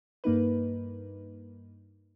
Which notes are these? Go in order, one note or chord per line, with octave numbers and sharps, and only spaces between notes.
G2 A#3 D#4 B4